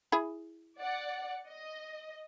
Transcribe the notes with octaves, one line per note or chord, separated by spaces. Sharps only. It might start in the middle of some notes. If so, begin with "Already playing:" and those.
E4 G#4 B5
D5 F#5
D#5